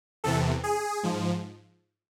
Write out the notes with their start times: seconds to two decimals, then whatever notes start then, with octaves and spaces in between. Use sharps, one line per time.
0.24 E2 C3 E3 A4
0.64 G#4
1.03 G#2 F3